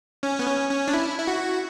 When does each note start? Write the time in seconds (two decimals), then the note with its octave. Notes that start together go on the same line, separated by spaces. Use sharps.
0.23 C#4
0.39 B3
0.47 C#4
0.70 C#4
0.88 D4
0.94 E4
1.18 E4
1.27 F#4